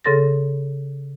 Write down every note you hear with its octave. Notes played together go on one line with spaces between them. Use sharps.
C#3 G#4 A4 C6 A6 A#6